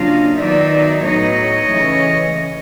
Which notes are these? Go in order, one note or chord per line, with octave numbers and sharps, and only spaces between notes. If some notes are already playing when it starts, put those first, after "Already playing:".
Already playing: C#3 F#3 A#3 D4 F4 D#5 F5
D#3 F#3 B3 D#4 D5 E5
A2 F#3 B3 D#4 C#5 D#5
C#3 E3 A3